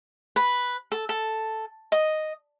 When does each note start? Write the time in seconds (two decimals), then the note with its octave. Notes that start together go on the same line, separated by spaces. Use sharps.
0.36 B4
0.92 A4
1.09 A4
1.92 D#5